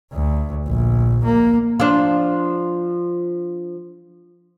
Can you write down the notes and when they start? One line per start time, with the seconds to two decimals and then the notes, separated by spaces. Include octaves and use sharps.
0.13 D2
0.66 A#1
1.24 A#3
1.80 F3 D4